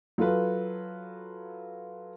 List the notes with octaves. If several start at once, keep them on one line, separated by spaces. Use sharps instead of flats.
F#3 F4 A4 B4